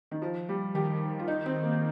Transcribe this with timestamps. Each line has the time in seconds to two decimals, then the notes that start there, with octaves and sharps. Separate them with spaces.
0.11 D#3
0.22 F3
0.49 G3
0.74 D#3 G4
1.19 F4
1.28 D#4
1.46 C4
1.63 A#3